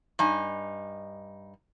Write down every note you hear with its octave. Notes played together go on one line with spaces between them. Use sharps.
G2 D#4 G#5